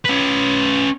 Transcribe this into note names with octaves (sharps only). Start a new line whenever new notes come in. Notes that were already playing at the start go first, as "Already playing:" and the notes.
C#4 B4